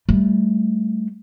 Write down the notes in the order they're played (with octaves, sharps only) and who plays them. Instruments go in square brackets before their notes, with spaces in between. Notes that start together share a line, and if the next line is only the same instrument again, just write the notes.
[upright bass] G3 A3